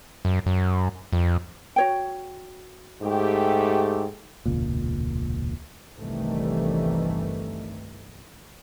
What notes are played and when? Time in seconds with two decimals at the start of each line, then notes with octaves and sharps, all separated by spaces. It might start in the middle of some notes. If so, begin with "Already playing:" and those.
0.25 F#2
0.46 F#2
1.13 F2
1.76 F#4 C#5 G5
3.02 G#2 A3 G4
4.46 E1 C#2 A#2
5.97 G1 C2 G2 D#3 E3 A3